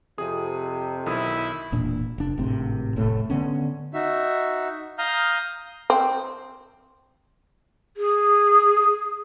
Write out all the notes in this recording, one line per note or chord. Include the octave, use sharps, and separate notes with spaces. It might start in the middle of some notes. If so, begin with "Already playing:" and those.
F2 C3 G#4 D#6
B1 D#3 E4 D#6
E1 A#2 D4
F1 D4
G#1 A2 C3 C4
F1 A2 A3
D3 B3 C#4
D#4 F#4 E5
F5 A#5 D#6 F6 G6
C4
G#4